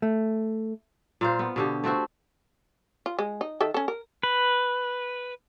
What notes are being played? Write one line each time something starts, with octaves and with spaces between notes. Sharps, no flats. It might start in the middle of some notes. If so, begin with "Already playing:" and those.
A3
A#2 F4 C5
B3
B2 D3 G4
A3 C4 F#4 C5
F4
G#3
D#4
D#3 A4 E5
C#4 A4
A#4
B4